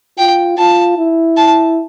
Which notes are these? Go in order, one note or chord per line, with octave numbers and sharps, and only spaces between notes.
F4 G5
F4 A5
E4
A5